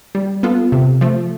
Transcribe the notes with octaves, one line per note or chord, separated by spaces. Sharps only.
G3
B3 F4 A4
C3
F3 A3